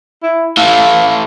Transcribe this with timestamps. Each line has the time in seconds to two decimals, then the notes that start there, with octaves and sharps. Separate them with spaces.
0.23 E4
0.57 A2 E3 F5